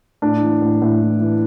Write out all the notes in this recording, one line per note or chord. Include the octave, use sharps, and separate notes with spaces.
A2 D4
E3
A2
A2
E3
E3